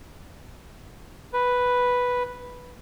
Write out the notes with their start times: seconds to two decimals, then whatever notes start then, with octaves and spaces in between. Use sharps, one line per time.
1.33 B4